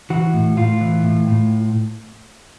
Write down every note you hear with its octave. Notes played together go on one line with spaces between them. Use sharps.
E3 F#4
A2
A2 F4
E3
A2
A2